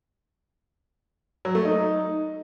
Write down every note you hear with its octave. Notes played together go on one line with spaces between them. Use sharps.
F#3
A3
D#4